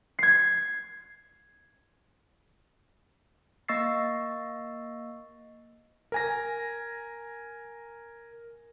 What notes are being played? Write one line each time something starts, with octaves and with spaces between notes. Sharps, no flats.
G#6 C7
A#3 D#5 C#6 E6 A6 C7
A#4 G#5 A#6